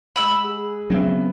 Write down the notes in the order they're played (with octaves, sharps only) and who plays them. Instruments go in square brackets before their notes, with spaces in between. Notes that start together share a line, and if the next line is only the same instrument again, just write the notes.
[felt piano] G#3 F#5 [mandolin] B5 E6
[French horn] G#4
[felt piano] C#3 B3 E5 [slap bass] F#3 C4